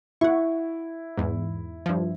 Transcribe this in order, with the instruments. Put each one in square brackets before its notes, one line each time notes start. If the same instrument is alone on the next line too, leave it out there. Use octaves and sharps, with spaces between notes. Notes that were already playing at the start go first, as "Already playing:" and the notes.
[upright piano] E4 [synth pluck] F#5 C#6
[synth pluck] E2 G#2
G2 F3